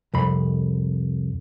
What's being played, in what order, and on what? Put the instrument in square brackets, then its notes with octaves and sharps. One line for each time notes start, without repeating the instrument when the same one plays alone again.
[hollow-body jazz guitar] C2 F2 B5